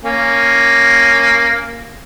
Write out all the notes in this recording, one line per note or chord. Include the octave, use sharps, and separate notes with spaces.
A#3 C#4